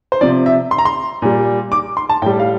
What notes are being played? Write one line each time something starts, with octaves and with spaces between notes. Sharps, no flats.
C5
C3 F3 D5
E5
C6
A#5
C6
A#2 G3
D6
C6
A5
A2 G3 G5
F5